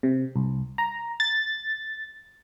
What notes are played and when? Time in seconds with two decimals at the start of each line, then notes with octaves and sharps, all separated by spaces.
0.03 C3
0.36 C2
0.78 A#5
1.20 A6